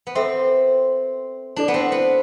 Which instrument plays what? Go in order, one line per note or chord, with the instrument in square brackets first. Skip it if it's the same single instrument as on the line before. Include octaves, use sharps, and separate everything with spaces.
[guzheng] B3
[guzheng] C4 [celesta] A4 E5 G5 C6
[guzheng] D4 [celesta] E4 A4 D5
[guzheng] B3
C4
B3